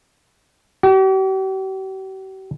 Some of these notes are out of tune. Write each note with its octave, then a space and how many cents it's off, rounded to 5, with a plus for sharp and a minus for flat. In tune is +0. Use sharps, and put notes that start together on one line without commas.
G4 -45